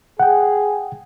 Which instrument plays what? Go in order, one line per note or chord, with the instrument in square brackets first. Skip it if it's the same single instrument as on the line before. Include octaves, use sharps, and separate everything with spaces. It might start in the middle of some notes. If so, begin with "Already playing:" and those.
[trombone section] G#4 [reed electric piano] F#5 G5